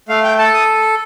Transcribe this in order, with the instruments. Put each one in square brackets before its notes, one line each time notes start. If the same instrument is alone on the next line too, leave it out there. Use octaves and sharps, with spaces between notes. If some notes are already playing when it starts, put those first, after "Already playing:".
[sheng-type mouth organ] A3 F5
G5
A4 A5
D#6